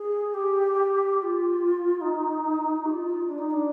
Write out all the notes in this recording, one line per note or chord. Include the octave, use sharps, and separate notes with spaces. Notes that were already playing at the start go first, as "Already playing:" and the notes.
Already playing: G#4
G4
G4
F4
D#4
G4
F4
D4
D#4
D4